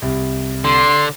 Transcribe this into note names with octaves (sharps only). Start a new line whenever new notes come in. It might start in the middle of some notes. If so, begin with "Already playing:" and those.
C2
D3 C6